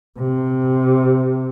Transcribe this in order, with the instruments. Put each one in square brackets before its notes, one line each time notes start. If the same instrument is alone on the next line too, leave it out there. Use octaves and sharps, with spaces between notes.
[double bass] C3